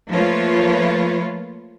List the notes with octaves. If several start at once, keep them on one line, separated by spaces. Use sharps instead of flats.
F3 A3 A#3 F4 B4 C#5